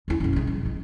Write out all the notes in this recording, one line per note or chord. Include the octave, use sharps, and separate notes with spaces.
E2 E4
F#2 C#3
C3 G#3
G2
G#3